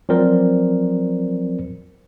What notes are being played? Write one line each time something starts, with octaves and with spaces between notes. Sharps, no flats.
F3 F#3 C4 A#4 C5 D5